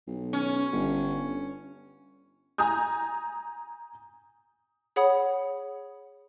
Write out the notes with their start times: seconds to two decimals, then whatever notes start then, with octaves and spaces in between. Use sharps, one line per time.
0.07 B1
0.33 C#4
0.73 G1
2.58 G#5 A#5 D#6 G6
4.96 G#4 C#5 F#5 B5 D#6